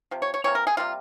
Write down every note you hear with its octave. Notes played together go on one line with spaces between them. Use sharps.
C3 F3
C#5
C#5
C3 E3 A#3 C#5
A#4
G#4
C3 G3 A#3 F4